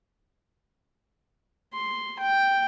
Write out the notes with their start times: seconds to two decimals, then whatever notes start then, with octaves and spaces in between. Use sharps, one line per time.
1.73 C6
2.19 G5